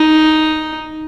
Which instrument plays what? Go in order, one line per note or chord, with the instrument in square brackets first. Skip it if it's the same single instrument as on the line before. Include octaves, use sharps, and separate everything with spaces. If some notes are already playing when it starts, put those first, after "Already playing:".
Already playing: [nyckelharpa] D#4